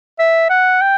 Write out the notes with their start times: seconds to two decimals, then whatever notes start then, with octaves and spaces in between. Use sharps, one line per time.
0.19 E5
0.49 F#5
0.81 G5